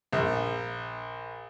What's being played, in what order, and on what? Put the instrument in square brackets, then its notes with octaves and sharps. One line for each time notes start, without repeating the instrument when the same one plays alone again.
[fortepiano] A#1